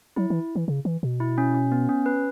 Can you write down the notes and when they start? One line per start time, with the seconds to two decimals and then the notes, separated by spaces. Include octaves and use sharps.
0.16 F#3 E4
0.30 E3
0.56 E3
0.68 C#3
0.85 E3
1.03 B2
1.20 E4
1.38 C#4
1.55 C#4
1.72 B3
1.89 C#4
2.06 B4